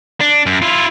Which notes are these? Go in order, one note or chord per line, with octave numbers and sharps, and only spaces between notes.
D4
F#2
E4 F4